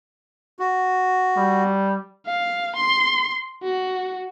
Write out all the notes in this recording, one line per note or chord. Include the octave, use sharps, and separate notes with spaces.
F#4
G3
F5
C6
F#4